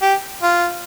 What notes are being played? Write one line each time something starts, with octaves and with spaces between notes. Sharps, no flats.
G4
F4